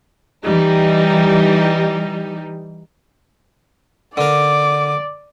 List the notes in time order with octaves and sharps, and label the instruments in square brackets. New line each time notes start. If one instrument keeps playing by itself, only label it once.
[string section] E3 G3 D#4
[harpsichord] D3 A#4 [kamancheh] D5 [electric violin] D6